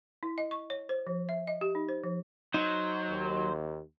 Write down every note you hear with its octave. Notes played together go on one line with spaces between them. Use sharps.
E4
D#5
C#6
C#5
C5
F3
E5
D#5
G4
D#4
C5
F3
F#3 D#4 C5
D#2